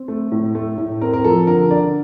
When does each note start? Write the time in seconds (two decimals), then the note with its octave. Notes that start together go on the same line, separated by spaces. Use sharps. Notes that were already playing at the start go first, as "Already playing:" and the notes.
Already playing: C4
0.08 A3
0.32 A2
0.55 A3
0.78 A2
1.01 C4 A#4
1.13 A#4
1.24 F3 A4
1.47 D3 A#4
1.71 D3 D5